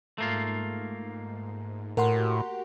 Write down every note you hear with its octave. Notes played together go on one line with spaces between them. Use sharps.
G#2 A3 A#3 F4
A2 F#4 G4 A#4 F#5 C6